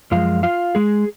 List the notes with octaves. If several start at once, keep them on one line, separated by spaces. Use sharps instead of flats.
F#2 F3 G#3 F4 F5
F4 F5
G#3 G#4